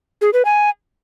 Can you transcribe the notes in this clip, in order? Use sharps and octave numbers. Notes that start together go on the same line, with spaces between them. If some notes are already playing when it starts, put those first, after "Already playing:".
G#4
B4
G#5